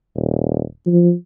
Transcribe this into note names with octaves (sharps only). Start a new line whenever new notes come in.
D#1
F3